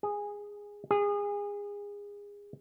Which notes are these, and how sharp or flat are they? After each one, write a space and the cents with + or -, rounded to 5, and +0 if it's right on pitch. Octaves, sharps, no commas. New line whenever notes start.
G#4 -10
G#4 -25